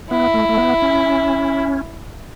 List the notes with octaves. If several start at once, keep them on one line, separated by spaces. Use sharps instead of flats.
B3 E4
A3
A3
B3
C#4